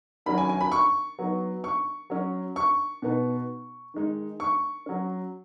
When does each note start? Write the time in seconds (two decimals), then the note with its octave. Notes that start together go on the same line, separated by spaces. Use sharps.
0.26 D#3 F#3 C#4 B5
0.38 G#5
0.49 G#5
0.61 B5
0.72 C#6
1.19 F#3 B3 D#4
1.64 C#6
2.10 F#3 C#4
2.56 C#6
3.02 B2 B3 D#4
3.94 D#3 G#3 D#4
4.40 C#6
4.86 F#3 C#4